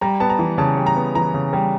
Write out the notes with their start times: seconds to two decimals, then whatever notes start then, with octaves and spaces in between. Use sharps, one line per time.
0.01 G3 A#5
0.20 B3 A5
0.30 A#5
0.39 E3
0.58 C#3 A5
0.77 G3
0.86 A#5
0.96 B3
1.15 E3 A#5
1.34 C#3
1.53 G3